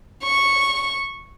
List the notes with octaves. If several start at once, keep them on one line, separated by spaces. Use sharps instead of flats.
C#6